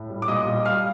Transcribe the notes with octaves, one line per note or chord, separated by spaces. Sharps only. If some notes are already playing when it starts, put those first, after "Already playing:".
Already playing: A2
G3
D6
A#2 D#5 D#6
G3
G3 F5 F6